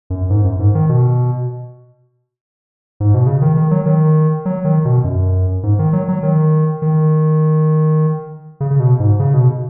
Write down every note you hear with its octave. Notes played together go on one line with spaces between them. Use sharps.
F#2
G#2
F#2
G#2
D#3
B2
G#2
B2
C#3
D#3
D#3
F#3
D#3
F#3
D#3
B2
F#2
G#2
D#3
F#3
F#3
D#3
D#3
C#3
C#3
B2
G#2
C#3
B2